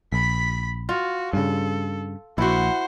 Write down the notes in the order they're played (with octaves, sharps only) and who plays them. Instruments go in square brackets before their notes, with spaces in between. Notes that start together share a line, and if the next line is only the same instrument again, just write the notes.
[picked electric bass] A#1 [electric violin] B5 B6
[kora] F4 [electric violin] F#4
[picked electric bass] G2 C#3 [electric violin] A4
[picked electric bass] A#1 [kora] E4 F#4 [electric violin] C5 F#5